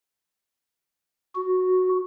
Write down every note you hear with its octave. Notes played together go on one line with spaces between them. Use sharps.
F#4